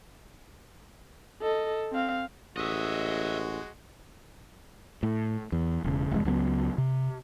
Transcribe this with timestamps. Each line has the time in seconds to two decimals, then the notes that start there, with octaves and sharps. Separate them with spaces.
1.42 A4 D#5
1.92 C4 F5
2.57 A1 G#3 F#4 D#5 E5
5.03 A2
5.52 E2
5.84 E1 C#3
6.11 F1 E2 G#2 G#3
6.25 C#2 F#3 A3 B3
6.78 C3